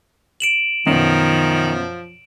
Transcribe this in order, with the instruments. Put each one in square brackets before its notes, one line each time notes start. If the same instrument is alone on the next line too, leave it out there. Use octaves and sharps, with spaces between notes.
[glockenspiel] D7 E7 F#7
[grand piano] F#2 B2 [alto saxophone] D#3 [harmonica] F3